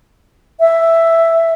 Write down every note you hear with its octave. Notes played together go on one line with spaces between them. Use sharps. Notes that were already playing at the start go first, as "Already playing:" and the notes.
E5